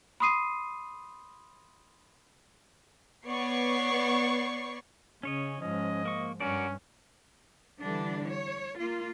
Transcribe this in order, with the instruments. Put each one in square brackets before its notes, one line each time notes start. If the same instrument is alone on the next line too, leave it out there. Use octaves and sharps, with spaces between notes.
[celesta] B5 C6 D#6 C7 D#7
[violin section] B3 C#5 D5 C#6 C7
[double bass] C#3 [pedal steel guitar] C#4 C#5 D#5
[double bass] G#2 F3 [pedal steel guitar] C#4 [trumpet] D#5
[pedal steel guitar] A#3 C#6
[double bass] G2 [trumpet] C#4 [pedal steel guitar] F#4 A#4 D5
[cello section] D3 E3 G3 D4
C#5
A#3 F4